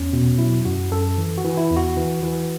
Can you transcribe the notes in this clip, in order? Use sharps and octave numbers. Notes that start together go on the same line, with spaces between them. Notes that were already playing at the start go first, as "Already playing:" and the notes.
Already playing: E2 C#4
B2
F#3 E4
F#2 F#4
F#2 A4
E3
F#4
E3
E4
E2
F#4
E3
E3